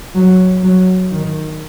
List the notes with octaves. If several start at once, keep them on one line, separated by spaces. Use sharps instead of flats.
F#3
F#3
D#3